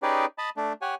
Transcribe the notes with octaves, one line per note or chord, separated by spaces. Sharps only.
C#4 D#4 G4 G#4 B4 D5
D#5 A5 B5
A3 D4
G4 C#5 F#5 G#5